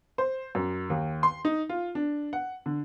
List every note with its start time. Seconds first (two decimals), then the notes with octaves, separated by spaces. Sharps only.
0.18 C5
0.55 F#2
0.90 D#2
1.23 C6
1.45 D#4
1.69 F4
1.95 D4
2.33 F#5
2.66 D3